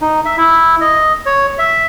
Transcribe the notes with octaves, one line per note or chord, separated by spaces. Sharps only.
D#4
E5
E4
D#5
C#5
E5